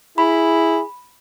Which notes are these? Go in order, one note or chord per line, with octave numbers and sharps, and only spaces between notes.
E4 G#4 B5